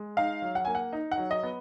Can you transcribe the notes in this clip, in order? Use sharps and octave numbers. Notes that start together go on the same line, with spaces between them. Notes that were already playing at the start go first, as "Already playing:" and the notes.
Already playing: G#3
D#4 F5
F#3
F#5
A#3 G#5
F#5
D#4
F#5
F#3
D#5
B3